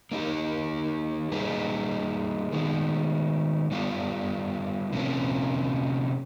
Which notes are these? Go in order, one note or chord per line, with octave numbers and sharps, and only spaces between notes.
A#3 D#4 G4
G3 A#3 D#4 G#4 B4
D#3 G#3 B3
G3 B3 D4 F4
C3 F3 A#3 C#4